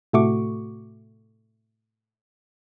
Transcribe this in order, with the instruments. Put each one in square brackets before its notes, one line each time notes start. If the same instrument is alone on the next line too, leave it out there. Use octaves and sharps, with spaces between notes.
[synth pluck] A2 C3 A3 F#4 C#6 D6